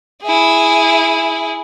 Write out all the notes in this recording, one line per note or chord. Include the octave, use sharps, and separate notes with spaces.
E4 G#4